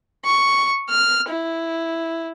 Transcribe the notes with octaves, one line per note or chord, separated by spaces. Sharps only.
C#6
F6
E4